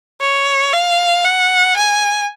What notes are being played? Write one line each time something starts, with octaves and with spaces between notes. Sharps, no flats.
C#5
F5
F#5
G#5